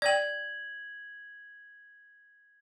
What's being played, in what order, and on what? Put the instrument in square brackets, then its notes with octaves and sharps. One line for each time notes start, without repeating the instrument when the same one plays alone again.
[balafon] D5 G5 [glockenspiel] G#6 F#7